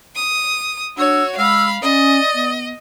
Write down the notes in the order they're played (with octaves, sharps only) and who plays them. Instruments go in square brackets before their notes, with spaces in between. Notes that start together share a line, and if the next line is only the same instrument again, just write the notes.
[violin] D#6
[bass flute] D4 [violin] F#4 C#5 [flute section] E6
[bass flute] G#3 [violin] F5 B5 [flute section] E6 F6
[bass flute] C#4 [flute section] D5 D#6 [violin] D#5
[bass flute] B3